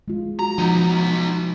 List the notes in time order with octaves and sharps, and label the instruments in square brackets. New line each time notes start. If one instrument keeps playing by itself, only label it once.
[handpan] G#3 F4
[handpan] F#4 [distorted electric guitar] A#5
[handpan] F3 [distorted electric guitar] B3 D#4